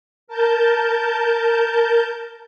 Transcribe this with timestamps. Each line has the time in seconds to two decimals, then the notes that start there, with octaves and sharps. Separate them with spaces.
0.28 A#4 A5 G6